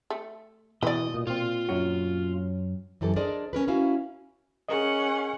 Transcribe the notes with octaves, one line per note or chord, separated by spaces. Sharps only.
A3
B2 E3 B3 B4 D5 D#5
A#2
A#2 C4 F4
F#2 C#4 F#4
F#2 E3 G4 A4
D4 G#4 A#4 C5 D5 D#5
C#4 A#4 B4
C#4 E4 F#4 A#4 F5
C#4 G#4 A#4 D#5 F#5